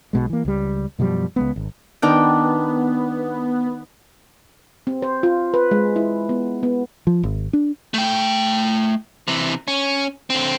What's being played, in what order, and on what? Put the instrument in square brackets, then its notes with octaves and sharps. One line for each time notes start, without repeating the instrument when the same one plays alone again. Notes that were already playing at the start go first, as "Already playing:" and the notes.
[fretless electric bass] B1 B2 G#3
E3 A#3
C#2 G3
F#2 B2 F3 G3
C#2 G#3 B3
G#1
[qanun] D#3 D4 G5 [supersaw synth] B3
[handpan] C4
C5
F4
B4
G#3
E4
B3
B3
[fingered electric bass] F3
G#1
D4
[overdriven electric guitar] A3 G5
C3 E3
C#4
D3 C4